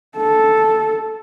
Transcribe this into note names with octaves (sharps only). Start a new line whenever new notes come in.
A4